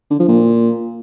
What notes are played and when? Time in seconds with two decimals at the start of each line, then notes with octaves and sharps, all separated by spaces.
0.11 D3
0.20 F3
0.28 A#2